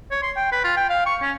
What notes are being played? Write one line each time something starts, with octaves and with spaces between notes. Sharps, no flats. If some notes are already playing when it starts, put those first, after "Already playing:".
C#5
C6
G5
B4
F4
G5
F5
C#6
C#4